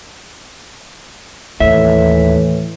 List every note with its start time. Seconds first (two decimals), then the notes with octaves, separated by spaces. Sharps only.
1.60 D#2 A2 E3 E5